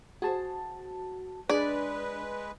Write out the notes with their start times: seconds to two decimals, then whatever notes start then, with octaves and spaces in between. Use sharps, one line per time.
0.22 F#4 G#4 C5 A5
1.50 G#3 D4 G#4 B4 D5